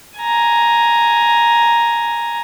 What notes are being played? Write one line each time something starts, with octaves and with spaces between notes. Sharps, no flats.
G#5 A#5